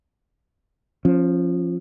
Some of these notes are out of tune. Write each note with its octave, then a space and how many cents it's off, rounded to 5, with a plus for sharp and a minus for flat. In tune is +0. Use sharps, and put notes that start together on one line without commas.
F3 +0 C#4 -30